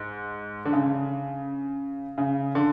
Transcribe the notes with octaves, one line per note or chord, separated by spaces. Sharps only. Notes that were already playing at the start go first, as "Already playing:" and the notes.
Already playing: G#2
D3
C#3
C#3
D3